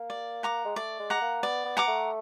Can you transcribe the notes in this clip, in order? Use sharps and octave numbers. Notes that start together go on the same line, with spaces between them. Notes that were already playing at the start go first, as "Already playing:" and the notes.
Already playing: A#3
D5
F#5 A#5 D6
G#3
A3 D5
G#3
F#5 A#5 D6
A#3
B3 D5
B3
F#5 A#5 D6
A3